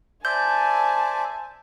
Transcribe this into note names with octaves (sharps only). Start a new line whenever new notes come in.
C5 D5 E5 G#5 A5 G6